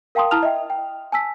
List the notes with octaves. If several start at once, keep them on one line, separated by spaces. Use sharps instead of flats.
A#4 F5 G5 A5 C6 D#6
E4 A5 A#5 D#6 F6 F7
D#5 E5 G5
G5
G#5 A5 E6 B6